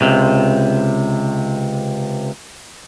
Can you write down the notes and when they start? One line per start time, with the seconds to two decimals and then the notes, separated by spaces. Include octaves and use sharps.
0.01 C#2 C3